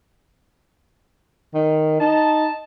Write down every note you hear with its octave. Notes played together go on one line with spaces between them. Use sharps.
D#3
D#4 A5